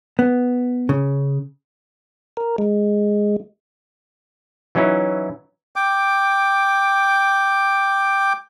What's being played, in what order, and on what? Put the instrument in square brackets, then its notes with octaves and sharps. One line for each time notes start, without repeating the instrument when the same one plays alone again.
[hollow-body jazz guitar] B3
C#3
[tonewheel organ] A#4
G#3
[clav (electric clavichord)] E3 F#3 C#4 D#4 E4
[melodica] G5 D6